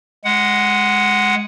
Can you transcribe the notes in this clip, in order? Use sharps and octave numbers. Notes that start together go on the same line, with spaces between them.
G#3 F#5